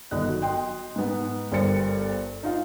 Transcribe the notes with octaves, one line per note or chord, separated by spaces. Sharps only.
G1 D#3 D#5 F#6
F#3
D#5 G5 C6
G#2 B3
G1 G2 A#4 C5 A6 C#7
D#4 F4 F5